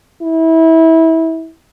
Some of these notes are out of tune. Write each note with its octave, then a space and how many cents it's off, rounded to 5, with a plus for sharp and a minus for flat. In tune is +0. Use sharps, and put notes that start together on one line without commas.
E4 -25